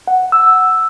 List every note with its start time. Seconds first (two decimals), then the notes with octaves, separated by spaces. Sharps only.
0.07 F#5
0.32 E6